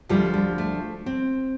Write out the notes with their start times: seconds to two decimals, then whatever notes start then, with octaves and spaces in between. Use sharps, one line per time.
0.09 D2 D3 F3 G3
0.34 G3
0.58 A3
1.06 C4